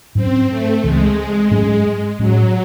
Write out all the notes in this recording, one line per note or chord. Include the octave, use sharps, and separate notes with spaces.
G#2 F#3 C4 C#4
A3
C#2 C#3 E3 G#3
G#2 F#3 A3 C#4
A2 F#3 G#3 C#4